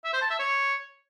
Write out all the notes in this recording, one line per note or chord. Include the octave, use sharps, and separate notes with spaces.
E5
C5
A5
E5
C#5